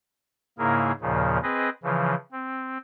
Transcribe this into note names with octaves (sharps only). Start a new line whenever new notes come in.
G#2 C#3 A#3 E4 G#4 A#4
D#2 A#2 C#3 F3
C4 G#4 B4 D#5
C#3 E3 F3
C4